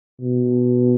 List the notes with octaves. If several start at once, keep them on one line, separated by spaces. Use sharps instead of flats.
B2